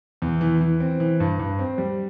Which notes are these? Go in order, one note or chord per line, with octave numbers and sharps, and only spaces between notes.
E2
E3
E3
C4
E3
G2
G2
C4
G3